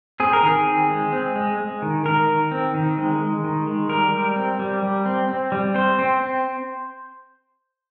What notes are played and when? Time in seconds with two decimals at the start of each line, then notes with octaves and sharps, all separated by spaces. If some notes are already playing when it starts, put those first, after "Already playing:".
0.20 C4 G#4
0.33 A#4
0.43 D#3 G#4
0.66 C4
0.90 G#3
1.13 C4
1.36 G#3
1.59 G#3
1.82 D#3
2.05 D#3 A#4
2.28 D#3
2.51 C4
2.74 D#3
2.98 G#3
3.20 G#3
3.44 D#3
3.67 G#3
3.90 G3 A#4
4.13 G3
4.36 C4
4.59 G3
4.83 G3
5.06 C4
5.28 C4
5.52 G3
5.75 C4 C5
5.99 C4
6.22 C4